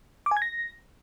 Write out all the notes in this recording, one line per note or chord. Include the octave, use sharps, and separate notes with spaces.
D6
G#5
G#6
A#6